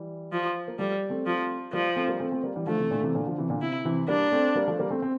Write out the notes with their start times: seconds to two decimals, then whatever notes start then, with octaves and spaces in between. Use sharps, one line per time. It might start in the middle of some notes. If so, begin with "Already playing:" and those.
Already playing: E3 G3
0.32 F3
0.68 A#3
0.79 F3 G3 A3
1.10 A3 C4
1.26 F3
1.73 F3 G3 A#3
1.96 A3 C4
2.08 G3 A#3
2.20 A3 C4
2.32 A3 C4
2.43 G3 A#3
2.56 E3 G3
2.67 D3 F3 A3
2.79 C3 E3
2.91 A#2 D3
3.02 C3 E3
3.15 A#2 D3
3.26 D3 F3
3.38 C3 E3
3.50 A#2 D3
3.61 C3 E4
3.85 C3 E3
4.08 G3 A#3 D4
4.32 A3 C4
4.55 G3 A#3
4.68 F3 A3
4.79 G3 A#3
4.91 A3 C4
5.02 C4